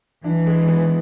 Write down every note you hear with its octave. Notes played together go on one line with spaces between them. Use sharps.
E3 D4
G#3
B3